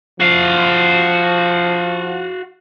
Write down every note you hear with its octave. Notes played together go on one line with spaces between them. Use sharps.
F3 F#4 F5